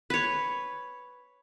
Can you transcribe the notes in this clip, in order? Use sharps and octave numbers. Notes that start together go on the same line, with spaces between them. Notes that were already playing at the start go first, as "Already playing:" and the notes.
B4 C#5